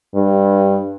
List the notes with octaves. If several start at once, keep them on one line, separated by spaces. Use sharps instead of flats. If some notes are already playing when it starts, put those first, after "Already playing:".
G2